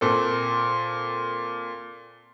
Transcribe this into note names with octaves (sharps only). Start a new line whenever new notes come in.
A#2 C4 A4